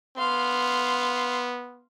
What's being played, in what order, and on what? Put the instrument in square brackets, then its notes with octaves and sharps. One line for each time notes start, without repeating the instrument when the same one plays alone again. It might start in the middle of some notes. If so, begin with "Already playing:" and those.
[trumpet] B3 [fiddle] F5 C6